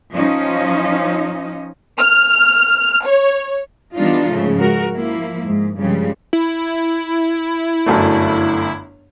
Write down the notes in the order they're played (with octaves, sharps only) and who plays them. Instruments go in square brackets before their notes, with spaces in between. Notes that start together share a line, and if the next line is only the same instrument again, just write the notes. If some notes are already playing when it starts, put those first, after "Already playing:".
[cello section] F3 C#4 D#4 D#5
[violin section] F6
C#5
[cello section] E3 G3 B3 D4 D#4 F4
G#2 C#3 F3 A3
G#3 F#4 A#4
F3 A#3 E4
G#2
G2 C#3 F3 G3 G#3
[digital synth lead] E4
[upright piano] G1 F#2 A3